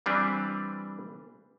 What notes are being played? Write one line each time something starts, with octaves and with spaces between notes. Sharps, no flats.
E3 G3 C4 D4 B4